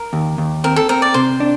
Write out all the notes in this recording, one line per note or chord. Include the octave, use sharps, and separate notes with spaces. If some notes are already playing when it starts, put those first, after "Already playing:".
Already playing: A#4
D#2
D#2
C4 A#4
A4
C4 A#4
D5
C3 C5
D4